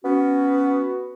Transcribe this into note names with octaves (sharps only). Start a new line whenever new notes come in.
B3 C#4 F#4